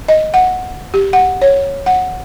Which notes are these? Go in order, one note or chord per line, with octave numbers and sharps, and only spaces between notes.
D#5
F#5
G4
F#5
C#5
F#5